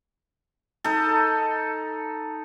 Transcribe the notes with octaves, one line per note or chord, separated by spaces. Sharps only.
D#4 A4